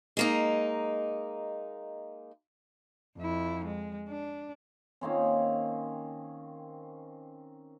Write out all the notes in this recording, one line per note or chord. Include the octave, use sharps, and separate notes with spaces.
G#3 A#3 D#4
F2 E4
G#3
D4
D#3 A#3 C4 C#4